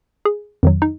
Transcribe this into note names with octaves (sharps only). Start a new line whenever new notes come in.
G#4
F2 D#3 F#3
D#4